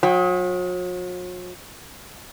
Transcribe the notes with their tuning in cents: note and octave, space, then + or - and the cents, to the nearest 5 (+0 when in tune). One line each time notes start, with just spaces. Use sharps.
F#3 -45 G5 +0